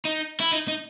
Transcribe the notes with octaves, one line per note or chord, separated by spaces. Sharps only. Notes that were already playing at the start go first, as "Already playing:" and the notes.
D#4
E4
D#4
D#4